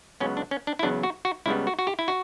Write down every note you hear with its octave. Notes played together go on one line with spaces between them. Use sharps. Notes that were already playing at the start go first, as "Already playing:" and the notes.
C#2 C#3 F#3 B3 C#4
D4
C#4
D4
E4
E2 C#3 F#3 B3 D4
F#4
F#4
C#2 C#3 G3 B3 E4
F#4
F#4
G4
E4
F#4